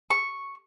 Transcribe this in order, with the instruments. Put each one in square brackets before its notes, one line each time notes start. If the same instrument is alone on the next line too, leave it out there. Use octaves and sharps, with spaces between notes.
[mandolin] C#6